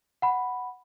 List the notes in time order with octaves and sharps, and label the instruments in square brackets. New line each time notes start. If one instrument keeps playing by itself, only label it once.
[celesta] F#5 B5